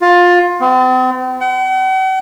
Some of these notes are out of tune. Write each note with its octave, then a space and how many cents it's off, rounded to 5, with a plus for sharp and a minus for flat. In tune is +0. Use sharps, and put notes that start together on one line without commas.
F4 +20
C4 -40
F#5 +45